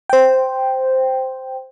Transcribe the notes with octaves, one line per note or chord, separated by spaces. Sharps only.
C5 G5